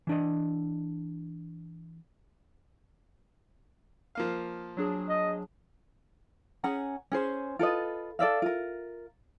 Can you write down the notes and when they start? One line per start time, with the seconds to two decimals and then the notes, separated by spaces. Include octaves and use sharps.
0.07 E3 D4 D#5
4.15 F3 A#3 F5
4.77 F#3 D4 G#4
5.09 D#5
6.64 C#4 G#4 F#5 A#5
7.12 C#4 G#4 C5
7.59 F4 A4 B4 D#5
8.19 A4 D5 E5 F5
8.42 F4 A#4